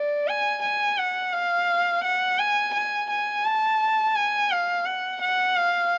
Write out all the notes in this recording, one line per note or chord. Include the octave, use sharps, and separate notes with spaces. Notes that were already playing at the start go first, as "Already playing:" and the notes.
Already playing: D5
G#5
G#5
F#5
F5
F#5
G#5
G#5
G#5
A5
G#5
F5
F#5
F#5
F5